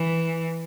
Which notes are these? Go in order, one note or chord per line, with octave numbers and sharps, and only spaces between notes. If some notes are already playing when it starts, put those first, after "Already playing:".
Already playing: E3